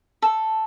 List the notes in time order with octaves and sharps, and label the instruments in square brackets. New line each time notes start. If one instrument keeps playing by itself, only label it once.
[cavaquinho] A4